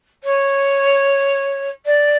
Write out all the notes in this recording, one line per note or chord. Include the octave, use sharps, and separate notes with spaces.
C#5
D5